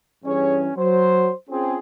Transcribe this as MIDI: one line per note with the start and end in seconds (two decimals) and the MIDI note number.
0.24 0.70 43
0.24 0.70 52
0.24 0.70 61
0.24 0.57 68
0.24 0.57 73
0.76 1.29 54
0.76 1.32 72
1.49 1.73 60
1.49 1.78 61
1.49 1.78 65
1.49 1.78 68